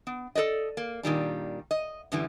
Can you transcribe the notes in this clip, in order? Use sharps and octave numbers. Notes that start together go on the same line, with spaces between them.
B3
A4 B4 D5 D#5
A#3
A#2 D#3 G3 D4
D#5
F#2 D3 E3 G3